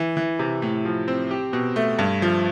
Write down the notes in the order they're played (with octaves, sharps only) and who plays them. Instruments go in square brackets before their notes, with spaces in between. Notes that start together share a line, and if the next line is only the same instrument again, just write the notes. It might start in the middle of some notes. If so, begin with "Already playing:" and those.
Already playing: [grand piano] E3
E3
C3
A2
F3
C4
G4
B2
A3
G2
F3